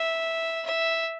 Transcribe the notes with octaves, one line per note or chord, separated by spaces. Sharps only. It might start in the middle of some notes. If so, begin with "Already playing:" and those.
Already playing: E5
E5